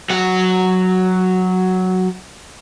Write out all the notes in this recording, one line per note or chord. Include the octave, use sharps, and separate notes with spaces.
F#3 F#5